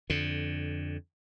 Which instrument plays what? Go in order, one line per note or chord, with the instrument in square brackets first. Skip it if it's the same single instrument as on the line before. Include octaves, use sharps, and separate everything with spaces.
[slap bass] F2 D3